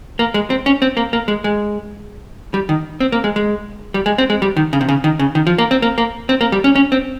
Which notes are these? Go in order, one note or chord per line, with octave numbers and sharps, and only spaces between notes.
A#3
G#3
C4
C#4
C4
A#3
A#3
G#3
G#3
G3
D#3
C4
A#3
G#3
G#3
G3
G#3
C4
G#3
G3
D#3
C#3
C3
C#3
D#3
C#3
D#3
F3
A#3
C4
A#3
A#3
C4
A#3
G3
C#4
C#4
C4